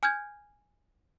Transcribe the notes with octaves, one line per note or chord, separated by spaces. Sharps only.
G#5 F6 G6 G#6